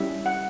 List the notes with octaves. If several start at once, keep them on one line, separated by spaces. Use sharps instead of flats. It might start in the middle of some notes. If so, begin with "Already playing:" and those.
Already playing: G3 C#4 E4 E5
F#5